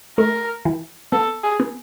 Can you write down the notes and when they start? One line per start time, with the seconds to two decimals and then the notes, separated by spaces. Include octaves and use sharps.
0.18 A3 A#4
0.65 E3
1.12 B3 A4
1.44 G#4
1.60 B3